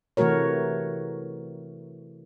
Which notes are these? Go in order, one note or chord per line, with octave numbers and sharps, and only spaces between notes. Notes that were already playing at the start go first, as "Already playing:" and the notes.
C3 E3 A3 F#4 A#4 C#5